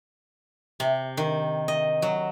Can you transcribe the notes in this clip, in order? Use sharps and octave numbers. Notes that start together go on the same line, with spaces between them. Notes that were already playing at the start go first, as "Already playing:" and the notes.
C3
D#3
D#5
F#3